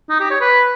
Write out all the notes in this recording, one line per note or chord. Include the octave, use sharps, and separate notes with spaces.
D#4
G4
C#5
B4